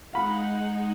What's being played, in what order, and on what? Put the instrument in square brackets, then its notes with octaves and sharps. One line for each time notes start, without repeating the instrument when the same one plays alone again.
[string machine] G#3 D#4 [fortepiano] F5 B5 [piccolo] F#5